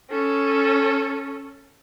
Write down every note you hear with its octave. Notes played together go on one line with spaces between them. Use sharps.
C#4 A4